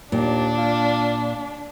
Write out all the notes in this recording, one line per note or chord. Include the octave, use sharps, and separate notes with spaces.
D#2 A#2 D4
F4